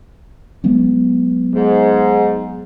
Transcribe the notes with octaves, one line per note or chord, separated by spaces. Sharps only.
F#3 G#3 B3
G#2